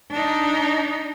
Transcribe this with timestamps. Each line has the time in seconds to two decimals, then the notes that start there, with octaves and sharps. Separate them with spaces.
0.11 D4 D#4